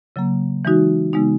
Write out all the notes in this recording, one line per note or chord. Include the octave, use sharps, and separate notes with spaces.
C#3 F#3 A#3
E3 G#3 D#4 F#4
C#3 G#3 B3 D#4